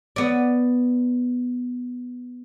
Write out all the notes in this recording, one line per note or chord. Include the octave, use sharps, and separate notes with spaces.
B3 D5